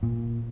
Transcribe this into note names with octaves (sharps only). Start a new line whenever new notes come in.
A#2